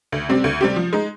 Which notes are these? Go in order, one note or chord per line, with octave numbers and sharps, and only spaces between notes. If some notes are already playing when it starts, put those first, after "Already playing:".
D2
C3 G3 C4 G4
D2
C3 G3 C4 G4
F3
G#3 D#4